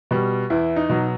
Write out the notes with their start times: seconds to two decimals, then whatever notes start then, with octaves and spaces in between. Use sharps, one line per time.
0.11 B2 G3
0.50 E2 E4
0.76 D#4
0.89 B2 F#3